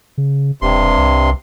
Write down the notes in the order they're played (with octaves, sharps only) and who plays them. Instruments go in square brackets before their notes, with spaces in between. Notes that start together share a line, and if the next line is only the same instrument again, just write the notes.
[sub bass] C#3
[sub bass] E1 [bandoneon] G2 C3 C6
[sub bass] C2